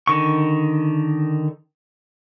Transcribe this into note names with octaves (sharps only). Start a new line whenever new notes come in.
D3 D#3 C#6